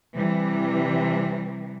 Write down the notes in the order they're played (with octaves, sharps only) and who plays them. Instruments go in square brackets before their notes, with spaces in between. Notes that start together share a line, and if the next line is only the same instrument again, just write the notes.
[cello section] C3 E3 G3